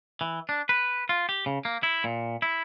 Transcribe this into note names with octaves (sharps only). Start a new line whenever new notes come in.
E3
D4
B4
F4
G4
C#3
A#3
E4
A#2
E4